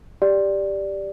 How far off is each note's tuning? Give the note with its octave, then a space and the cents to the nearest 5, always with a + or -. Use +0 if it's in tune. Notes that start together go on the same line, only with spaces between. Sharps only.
G4 +5 D5 +0